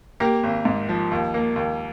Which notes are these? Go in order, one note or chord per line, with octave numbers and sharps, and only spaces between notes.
A#3 G4 A#4
G#1
G#2
F3
D#2
A#3
D#2